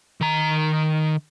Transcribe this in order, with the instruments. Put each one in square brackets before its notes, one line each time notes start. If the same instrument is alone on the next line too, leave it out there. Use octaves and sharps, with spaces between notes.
[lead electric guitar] D#3 A#5